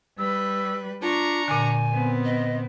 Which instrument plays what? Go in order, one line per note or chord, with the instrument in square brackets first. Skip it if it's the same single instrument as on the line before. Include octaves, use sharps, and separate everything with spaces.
[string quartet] G3 B4 [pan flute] E6
[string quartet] D4 A#5 C#6 [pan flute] F4
[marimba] A#2 D3 [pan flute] G#5
[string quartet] B3 C4
[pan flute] D#5